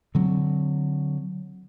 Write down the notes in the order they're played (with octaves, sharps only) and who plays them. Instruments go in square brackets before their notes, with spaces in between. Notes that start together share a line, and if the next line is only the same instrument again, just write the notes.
[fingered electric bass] D3 F#3 C4